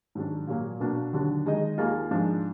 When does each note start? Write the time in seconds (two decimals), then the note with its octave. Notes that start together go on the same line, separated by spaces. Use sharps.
0.15 G#2 D#3 F#3 D4
0.47 A#2 F#3 A#3
0.80 B2 A#3 D4 F#4
1.13 D#2 D3 F#3 D4
1.46 D#3 G#3 D#4 G#4 D#5
1.78 D#2 D#3 A#3 F4 G#4
2.11 G#2 F3 G#3 D4